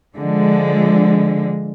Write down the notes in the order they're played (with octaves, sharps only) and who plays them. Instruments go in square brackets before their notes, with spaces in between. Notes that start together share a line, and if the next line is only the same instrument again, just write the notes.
[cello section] D3 F3 G#3